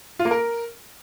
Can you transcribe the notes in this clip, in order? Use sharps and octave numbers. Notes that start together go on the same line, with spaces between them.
F4
A#3
A#4